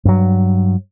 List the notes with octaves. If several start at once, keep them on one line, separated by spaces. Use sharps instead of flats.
G2 F#3